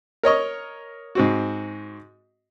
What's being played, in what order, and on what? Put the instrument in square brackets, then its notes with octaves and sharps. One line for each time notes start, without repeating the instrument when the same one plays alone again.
[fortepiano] A#4 C#5 D#5 C#6
G#2 C4 F#4